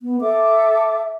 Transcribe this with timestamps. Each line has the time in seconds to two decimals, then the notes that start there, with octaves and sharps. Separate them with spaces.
0.02 B3
0.21 A4 E5 D6